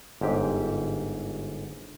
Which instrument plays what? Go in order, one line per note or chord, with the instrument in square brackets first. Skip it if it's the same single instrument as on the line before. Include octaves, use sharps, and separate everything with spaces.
[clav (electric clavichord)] G1 G#2 G4